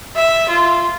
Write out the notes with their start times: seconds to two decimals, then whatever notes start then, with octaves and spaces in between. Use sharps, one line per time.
0.16 E5
0.49 F4